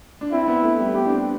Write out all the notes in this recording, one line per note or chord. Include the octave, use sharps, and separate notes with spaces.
D4
C4 E4
B3
A3
G3
A3
B3 G4
D4
C4